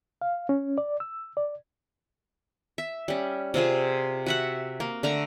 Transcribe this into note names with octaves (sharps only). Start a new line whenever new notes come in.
F5
C#4
D5
E6
D5
E5
G3 C#4
C3 C4 F4 G#4
F#4 E5 F#5
A#3
D3 A3 A#5